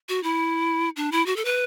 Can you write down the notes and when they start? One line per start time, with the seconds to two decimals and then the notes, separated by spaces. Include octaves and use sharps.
0.09 F#4
0.23 E4
0.96 D4
1.12 E4
1.26 F#4
1.36 A4
1.45 B4